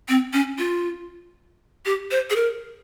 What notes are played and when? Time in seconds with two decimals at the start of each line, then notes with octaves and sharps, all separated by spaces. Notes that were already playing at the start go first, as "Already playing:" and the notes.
0.09 C4
0.33 C#4
0.58 F4
1.85 G4
2.11 C5
2.30 G#4
2.36 A#4